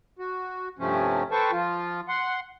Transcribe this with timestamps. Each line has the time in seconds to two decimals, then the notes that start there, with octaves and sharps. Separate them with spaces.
0.19 F#4
0.79 G2 C3 F3 A3 C4 C#4
1.31 A4 B4 C5 G5 A5 C#6
1.52 F3 F4
2.08 F#5 C6